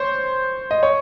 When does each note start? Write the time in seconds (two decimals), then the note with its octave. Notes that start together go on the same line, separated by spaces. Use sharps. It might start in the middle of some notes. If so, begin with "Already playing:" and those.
Already playing: C5 C#5
0.71 D#5
0.83 C#5